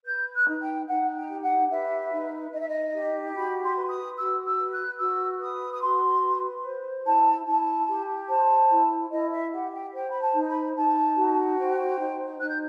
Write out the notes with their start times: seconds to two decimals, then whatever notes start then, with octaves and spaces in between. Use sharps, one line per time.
0.05 B4 G6
0.33 F#6
0.47 D#4
0.60 G5
0.87 D#4 F#5
1.15 G5
1.29 G4
1.43 F#5
1.70 B4 E5
2.11 D#4
2.52 D#4 D#5
2.60 E5
2.68 D#5
2.94 G4
3.34 F#4 B5
3.62 C6
3.76 B4
3.89 D#6
4.17 F#4 E6
4.44 E6
4.58 B4
4.71 F#6
4.99 F#4 E6
5.40 B4 D#6
5.72 D#6
5.81 F#4 C6
6.22 B4
6.64 C5
7.05 E4 A5
7.46 E4 A5
7.87 G4
8.28 C5 A5
8.70 E4
9.10 E4 D#5
9.31 E5
9.52 G4 F#5
9.72 G5
9.93 C5 G5
10.09 B5
10.20 A5
10.34 D#4
10.47 B5
10.75 D#4 A5
11.16 F#4
11.57 C5 G5
11.98 D#4
12.39 D#4 F#6
12.49 G6